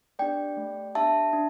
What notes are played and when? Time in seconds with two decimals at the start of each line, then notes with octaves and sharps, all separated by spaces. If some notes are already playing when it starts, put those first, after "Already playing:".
0.19 B3 D4 G4 D5 G5
0.57 A3 G4
0.95 B3 D4 G4 E5 A5
1.33 D4